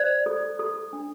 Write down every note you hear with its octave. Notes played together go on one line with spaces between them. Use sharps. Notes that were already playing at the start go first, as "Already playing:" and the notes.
Already playing: C5 D5
A4
A4
D4